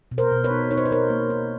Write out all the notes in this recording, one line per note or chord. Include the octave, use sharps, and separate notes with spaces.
B2
A#4 C5
B2
B4 C#5
D#4
D#4 C#5
C5
B4
D#4 A#4 C5
A#3
D#4